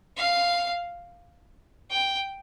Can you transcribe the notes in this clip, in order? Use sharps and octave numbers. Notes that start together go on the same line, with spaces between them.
F5
G5